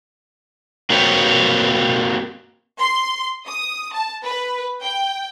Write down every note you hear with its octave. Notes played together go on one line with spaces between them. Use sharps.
A#3 C4 F#4 G4 B4 C#5
C6
D#6
A5
B4
G5